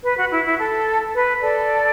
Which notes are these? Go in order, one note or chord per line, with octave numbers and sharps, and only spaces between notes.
B4
F#4
E4
E4
A4
B4
A4 D5